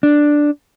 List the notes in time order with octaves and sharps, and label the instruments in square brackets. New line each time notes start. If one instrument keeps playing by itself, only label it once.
[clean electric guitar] D4